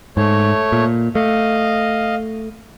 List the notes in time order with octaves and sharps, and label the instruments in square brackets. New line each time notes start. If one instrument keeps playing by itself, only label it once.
[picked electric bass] G#2 [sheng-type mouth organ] A3 C#5
[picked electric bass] A#2
[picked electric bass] A3 [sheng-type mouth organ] D#5 F5